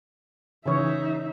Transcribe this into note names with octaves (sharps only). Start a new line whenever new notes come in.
C#3 E3 D#4 C#5 E5